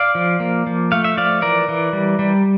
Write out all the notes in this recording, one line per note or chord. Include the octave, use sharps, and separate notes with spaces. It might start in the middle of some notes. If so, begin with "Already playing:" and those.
Already playing: D5 F5
F3
A#3
F3
A3 F5
E5
F3 D5 F5
E3 A#4 D5
E3
G3
G3